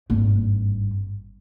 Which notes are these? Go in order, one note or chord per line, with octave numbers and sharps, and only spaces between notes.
G#1 G2